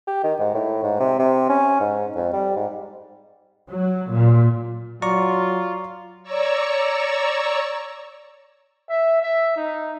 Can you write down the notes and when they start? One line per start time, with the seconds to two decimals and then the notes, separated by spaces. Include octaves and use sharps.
0.07 G4
0.24 D#3
0.40 G#2
0.54 A2
0.83 G#2
1.00 C3
1.19 C3
1.49 C#4
1.80 G#2
2.15 F2
2.33 G3
2.57 G#2
3.70 F#3
4.12 A#2
5.02 F#3 F4 D5 A#5 C#6
6.23 C#5 D5 A#5 C#6 E6
8.89 E5
9.22 E5
9.56 D#4